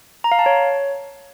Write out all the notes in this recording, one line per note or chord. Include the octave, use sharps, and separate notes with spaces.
A#5
F5
A5
C#5